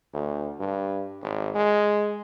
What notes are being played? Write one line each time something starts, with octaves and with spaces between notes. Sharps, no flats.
D2
G2
G#1
G#3